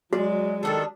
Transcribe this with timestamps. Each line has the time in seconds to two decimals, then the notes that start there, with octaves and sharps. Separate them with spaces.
0.13 F#3 G#3 F#4 D5
0.63 D#3 G3 D4 G#4 A4